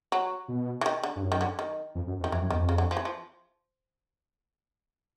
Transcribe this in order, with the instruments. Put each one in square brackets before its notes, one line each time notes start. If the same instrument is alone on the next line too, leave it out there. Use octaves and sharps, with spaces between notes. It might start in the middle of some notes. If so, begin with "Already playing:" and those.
[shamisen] F#3
[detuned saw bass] B2
[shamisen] E3
D#3
D3
[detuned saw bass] G2
F#2
[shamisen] D#3
D3
D#3
[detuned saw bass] F2
F#2
F2
[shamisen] D#3
[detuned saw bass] F2 [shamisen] E3
[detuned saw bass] F#2
[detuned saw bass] E2 [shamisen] D#3
[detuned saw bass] F2
[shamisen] C#3
D3
F3
E3
F3